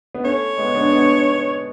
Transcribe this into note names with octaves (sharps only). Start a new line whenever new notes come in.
B3
A3 C#4 C#5
G#3 B3
B3 D4
B3 D4